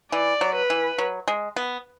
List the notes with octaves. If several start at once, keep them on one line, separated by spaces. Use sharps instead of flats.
E3 D5
F#3
B4
E3
F#3
G#3
B3